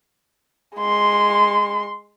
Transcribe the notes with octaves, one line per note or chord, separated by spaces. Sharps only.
G#3 C6